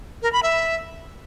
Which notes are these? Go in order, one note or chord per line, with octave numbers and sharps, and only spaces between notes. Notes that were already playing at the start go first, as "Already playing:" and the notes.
A#4
B5
E5